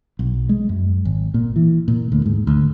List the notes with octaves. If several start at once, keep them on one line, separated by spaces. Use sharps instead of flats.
B1
G#3
F#2
G#1
A#2
E3
A#2
D2
G#2
D2